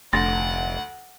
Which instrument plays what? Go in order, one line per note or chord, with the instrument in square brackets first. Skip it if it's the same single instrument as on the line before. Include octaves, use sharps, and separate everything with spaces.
[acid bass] F1 [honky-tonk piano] D2 [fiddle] F#5 [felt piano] C6 A6 A#6